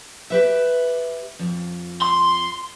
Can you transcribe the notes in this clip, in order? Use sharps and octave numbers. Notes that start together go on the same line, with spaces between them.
G4 B4 E5
F2
C6